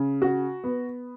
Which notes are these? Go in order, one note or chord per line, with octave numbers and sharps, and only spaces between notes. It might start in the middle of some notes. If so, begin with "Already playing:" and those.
Already playing: C#3
F#4
B3